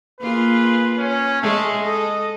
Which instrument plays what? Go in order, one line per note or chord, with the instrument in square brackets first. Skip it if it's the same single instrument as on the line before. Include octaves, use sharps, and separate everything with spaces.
[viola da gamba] A#3 F4 G#4 [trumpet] B4
[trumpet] C#4
[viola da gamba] G#3 G#4 [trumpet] A3
[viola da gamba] A4 [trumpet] D#5